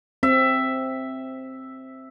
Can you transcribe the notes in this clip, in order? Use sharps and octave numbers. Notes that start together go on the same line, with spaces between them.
C4 E5